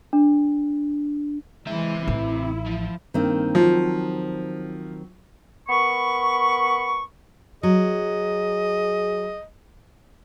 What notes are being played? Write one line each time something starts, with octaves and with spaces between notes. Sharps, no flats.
D4
E3 G#3 C4 E5
A1 E4
F3
G2 D#3 A#3 C4
F3 F#3
B3 A#4 B5 C#6
F#3 G#4 D#5